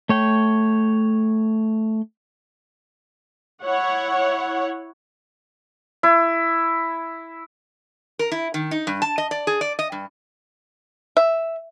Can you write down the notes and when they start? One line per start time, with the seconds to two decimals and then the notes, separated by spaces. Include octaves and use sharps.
0.09 A3 C#5 G5
3.63 E4 C#5 F#5
6.03 E4
8.19 A#4
8.32 E4
8.54 D#3
8.71 D#4
8.87 G2
9.02 A5
9.18 D#5
9.31 D5
9.47 G#4
9.61 D5
9.79 D#5
9.92 G2
11.17 E5